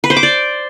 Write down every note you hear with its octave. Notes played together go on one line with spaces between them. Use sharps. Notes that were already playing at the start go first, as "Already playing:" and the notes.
B4
C5
D6
D5